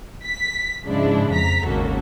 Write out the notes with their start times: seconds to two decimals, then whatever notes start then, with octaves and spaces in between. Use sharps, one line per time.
0.24 B6
0.85 G#2 C#3 F3 G#3 D4 E4
1.32 F2 A#5 B6
1.65 G#1 D#2 C#3 A#3 F#4 A4